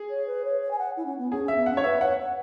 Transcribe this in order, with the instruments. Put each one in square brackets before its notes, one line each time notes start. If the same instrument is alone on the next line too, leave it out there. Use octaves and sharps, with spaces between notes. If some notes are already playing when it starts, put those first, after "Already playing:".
Already playing: [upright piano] G#4
[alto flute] C#5
B4
C#5
C#5
G#5
F#5
E4
C#4
B3
[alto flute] C#4 [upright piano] G#4
[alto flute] C#4 [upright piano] E5
[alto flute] B3
[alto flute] C#4 [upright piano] F#5
[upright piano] C#5
[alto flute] B4 [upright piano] E5
[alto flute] C#5 [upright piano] F#5
[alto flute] F#5